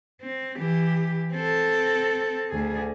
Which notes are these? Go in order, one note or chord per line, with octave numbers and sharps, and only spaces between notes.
C4
E3 G4
C4 A4
D2 G#4